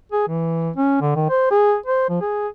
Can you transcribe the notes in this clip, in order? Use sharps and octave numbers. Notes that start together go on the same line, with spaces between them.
G#4
E3
C#4
D3
D#3
C5
G#4
C5
F3
G#4